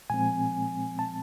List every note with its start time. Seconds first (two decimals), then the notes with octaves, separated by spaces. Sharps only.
0.10 A#2 F3 G#3 C4 G#5
0.99 A5